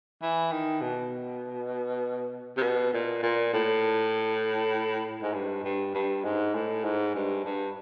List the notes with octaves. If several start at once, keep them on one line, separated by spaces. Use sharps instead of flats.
E3
D#3
B2
C3
B2
A#2
A#2
A2
G#2
G2
G2
G2
G#2
A2
G#2
G2
G2